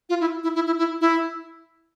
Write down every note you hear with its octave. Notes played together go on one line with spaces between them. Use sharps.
F4
E4
E4
E4
E4
E4
E4